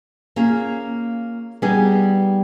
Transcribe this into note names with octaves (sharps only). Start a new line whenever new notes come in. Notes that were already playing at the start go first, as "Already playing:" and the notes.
A#3 C#4 F4 G#4
G3 B3 D#4 G#4